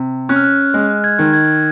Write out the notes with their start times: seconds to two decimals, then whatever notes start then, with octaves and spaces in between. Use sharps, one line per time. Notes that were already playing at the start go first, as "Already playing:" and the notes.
Already playing: C3
0.29 C#4 F#6
0.36 F6
0.44 F#6
0.74 G#3
1.04 G#6
1.19 D#3
1.33 G#6